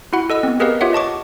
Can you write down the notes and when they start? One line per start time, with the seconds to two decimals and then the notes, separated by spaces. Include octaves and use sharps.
0.13 E4 F#4 F#5 B5
0.30 A4 D#5 E6
0.43 B3 C4
0.60 G4 G#4 A#4 B4 D#5 F5
0.81 F4 G4 C#5 E5 F#5
0.93 D#5 A5 C#6 D6